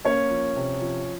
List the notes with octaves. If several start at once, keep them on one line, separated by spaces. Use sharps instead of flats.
A#3 C#4 C#5
F3
C3
F3